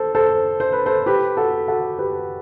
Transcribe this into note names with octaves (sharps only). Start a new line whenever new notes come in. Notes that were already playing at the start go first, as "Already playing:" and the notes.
Already playing: A4 C5
A4 C5
C5
B4
A4 C5
G4 B4
F#4 A4
F#4 A4
G4 B4